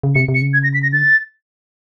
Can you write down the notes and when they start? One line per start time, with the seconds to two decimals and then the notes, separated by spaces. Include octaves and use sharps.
0.03 C#3
0.15 C3 C#7
0.28 C3
0.35 C#7
0.42 C#3
0.54 G#6
0.63 A#6
0.74 B6
0.83 A#6
0.93 D3 A6